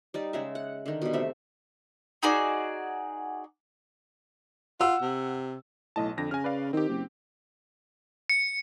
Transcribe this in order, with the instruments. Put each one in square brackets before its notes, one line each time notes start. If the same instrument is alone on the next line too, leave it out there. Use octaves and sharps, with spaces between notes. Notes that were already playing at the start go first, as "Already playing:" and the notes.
[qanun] G3 D#4 D5
C#3 G#3 E5
F#5
D3 D#3
B2 G3
C3 A3 E5
[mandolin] D#4 F#4 G#4 D5
[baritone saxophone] F4 [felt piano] F#5 E6
[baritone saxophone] C3
[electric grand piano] B1 D#5 A5 [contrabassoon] A2
[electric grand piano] F2 A#6 [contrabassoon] D3
[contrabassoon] C#3 [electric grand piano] G#5 F6
[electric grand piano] B4 D5 F5
[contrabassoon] D#3 [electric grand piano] C4 G4
[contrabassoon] F#1
[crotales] C#7